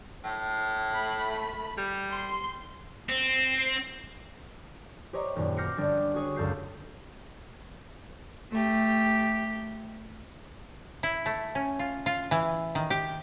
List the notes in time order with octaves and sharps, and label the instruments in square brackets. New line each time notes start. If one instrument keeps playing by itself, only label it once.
[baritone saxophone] A2
[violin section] A3 B5
[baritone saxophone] G3
[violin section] C6
[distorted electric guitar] C4
[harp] G4 C5 C#5 D#5 A#5
D#1 F#2
D6 F6 G6 A#6 C7 C#7
G1 G3 D4
F#4 G#4 C#5
C#2 F#2 A4 F5 G6 C7
[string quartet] A3 G4
[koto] E4
A3
C#4
F4
F4
E3
D#3
G4